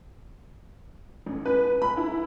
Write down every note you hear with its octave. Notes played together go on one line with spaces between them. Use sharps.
A1
B4
B5
E4